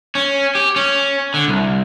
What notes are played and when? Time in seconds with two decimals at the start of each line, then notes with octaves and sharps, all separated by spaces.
0.15 C#4
0.55 G4
0.76 C#4
1.34 D3
1.48 C2